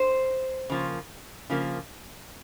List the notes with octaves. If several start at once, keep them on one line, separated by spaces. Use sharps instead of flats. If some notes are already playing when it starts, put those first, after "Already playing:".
Already playing: C5
C#3 F3 A#3
C#3 F3 A#3